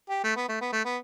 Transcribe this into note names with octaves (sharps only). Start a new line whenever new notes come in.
G4
A3
B3
A3
B3
A3
B3